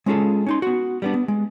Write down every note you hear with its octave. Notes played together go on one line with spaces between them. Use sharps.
G#3 C#4 F4 G#4 A4
C#4 D#4 C6
B3 F#4
G3 B3 D4
B3
G#3